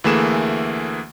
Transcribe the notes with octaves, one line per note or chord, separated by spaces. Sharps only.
D2 E3 A3 A#3 G#4 E7